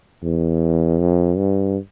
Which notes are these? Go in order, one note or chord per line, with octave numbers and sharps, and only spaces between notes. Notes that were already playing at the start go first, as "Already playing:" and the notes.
E2
F2
G2